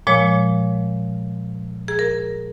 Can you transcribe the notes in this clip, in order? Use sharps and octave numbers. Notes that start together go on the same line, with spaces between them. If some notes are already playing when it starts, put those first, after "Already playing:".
A#2 F3 G#3 C#5
G#4
A#4